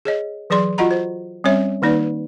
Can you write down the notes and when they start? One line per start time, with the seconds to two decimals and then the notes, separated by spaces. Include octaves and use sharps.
0.05 G#4 C#5 D#5
0.50 E3 F#3 G#4 D5 C6
0.78 F4 F#4 D#5 F#5 A#5 B5
0.91 C5
1.44 G3 C4 C#4 C#5 E5
1.82 D#3 A#3 D#4 B4 D5